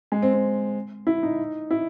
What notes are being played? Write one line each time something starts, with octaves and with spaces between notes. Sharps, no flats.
G#3
C4
C4
E4
D#4
E4